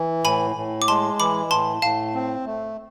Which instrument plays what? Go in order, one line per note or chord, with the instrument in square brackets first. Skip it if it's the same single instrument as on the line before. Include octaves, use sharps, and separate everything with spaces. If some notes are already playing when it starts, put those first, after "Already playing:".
Already playing: [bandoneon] E3
[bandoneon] A2 [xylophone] G#5 B5
[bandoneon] A2
[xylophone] D6
[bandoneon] G#3 [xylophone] A5 C6
[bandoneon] E3 [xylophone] B5 D6
[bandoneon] A2 [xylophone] A5 C6
[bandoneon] A2 [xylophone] F5 A5
[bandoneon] C4
A3